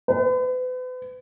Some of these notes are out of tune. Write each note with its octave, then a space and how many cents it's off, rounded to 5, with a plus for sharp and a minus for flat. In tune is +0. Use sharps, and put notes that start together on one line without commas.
B4 +40